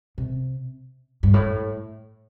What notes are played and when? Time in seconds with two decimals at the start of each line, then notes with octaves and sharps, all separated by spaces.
0.18 C3
1.23 G2
1.34 A2